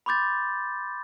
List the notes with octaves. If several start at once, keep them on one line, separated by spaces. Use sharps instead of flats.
B5 C6 D6 G6 A6